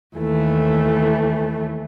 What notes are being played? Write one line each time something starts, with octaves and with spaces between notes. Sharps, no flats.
D#2 E3 A3